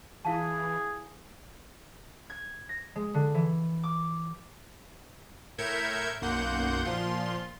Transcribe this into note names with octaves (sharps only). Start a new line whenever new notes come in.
E3 E4 G#4 F5 A5
G#6
A#6
G#3
D3
E3
D6
A2 A#4 E5 G6 G#6 C#7
B1 F#2 A#3 F#5 C6 G6
A#2 F3 F4 C6